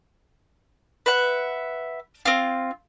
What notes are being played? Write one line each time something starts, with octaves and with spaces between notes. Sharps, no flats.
B4 E5 F#5
C4 F4